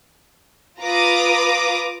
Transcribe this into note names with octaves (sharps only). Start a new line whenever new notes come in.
F4 B4 A#5 D6 D#6